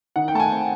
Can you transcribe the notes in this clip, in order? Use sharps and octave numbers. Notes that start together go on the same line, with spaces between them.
D#3 F#5
G5
A3 A5
G#5
C4